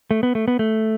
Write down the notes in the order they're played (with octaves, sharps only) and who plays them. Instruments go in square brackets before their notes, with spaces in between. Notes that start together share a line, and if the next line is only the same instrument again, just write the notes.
[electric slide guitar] A3
B3
A3
B3
A3